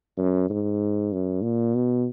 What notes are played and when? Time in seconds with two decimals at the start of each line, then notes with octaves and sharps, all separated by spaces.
0.17 F#2
0.50 G#2
1.12 F#2
1.43 A#2
1.75 B2